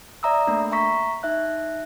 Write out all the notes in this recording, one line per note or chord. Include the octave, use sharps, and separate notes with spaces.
D5 E5 A#5 D#6 E6
A3 A#3 D4
E5 A#5 C#6 B6
D#4 E5 F#6